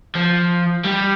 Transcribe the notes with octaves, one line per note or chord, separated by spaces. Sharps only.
F3
G3